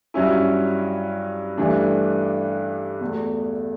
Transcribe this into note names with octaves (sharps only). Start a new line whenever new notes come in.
G2 F#3 C#4 E4
G2 E3 A3 D4
E2 B2 A3